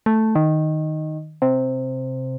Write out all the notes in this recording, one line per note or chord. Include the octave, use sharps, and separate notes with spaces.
A3
D#3
C3